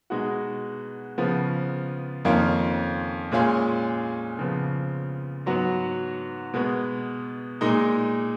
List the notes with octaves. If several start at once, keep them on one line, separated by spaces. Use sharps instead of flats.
B2 G#3 D#4 F#4
C#3 F3 B3
F2 D#3 A#3 C#4 F4
A#2 G#3 C#4 F4 G#4
C#3 F3 B3
G#2 F#3 B3 F#4
B2 G#3 B3
A#2 G#3 D#4